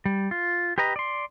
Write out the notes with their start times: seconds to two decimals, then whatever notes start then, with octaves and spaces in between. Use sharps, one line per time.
0.05 G3
0.31 F4
0.78 G4 B4 D#5 A#5
0.96 D5 C6